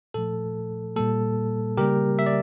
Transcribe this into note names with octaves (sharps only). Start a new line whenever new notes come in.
A#2 F3 A3 A4
A#2 G3 A#3 A4
C#3 G3 A#3 G4 A#4
E5
D5